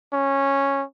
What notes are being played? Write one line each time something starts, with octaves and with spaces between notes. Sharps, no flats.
C#4